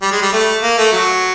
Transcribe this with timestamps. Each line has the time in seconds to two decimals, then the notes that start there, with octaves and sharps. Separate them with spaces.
0.02 G3
0.12 G#3
0.22 G3
0.33 A3
0.63 A#3
0.78 A3
0.92 F#3